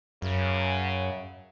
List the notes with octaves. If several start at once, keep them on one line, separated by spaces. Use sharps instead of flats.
F#2 C#3